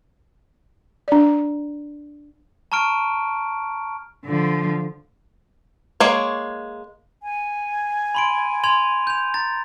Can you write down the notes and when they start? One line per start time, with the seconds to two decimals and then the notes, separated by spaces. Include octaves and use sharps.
1.08 D4 D5
2.72 A5 A#5 C#6 F6 D7
4.25 D3 F3
6.00 G#3 A#3 C#5
7.21 G#5
8.15 B5 C6 D7
8.64 C6 G#6 F7
9.07 G6 F7
9.34 A#5 A6